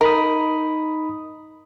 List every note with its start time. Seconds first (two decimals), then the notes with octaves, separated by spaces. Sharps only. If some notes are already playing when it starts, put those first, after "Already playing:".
0.01 D#4 A#4 B5 D#6